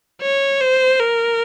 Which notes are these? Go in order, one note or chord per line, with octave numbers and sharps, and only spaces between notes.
C#5
C5
A#4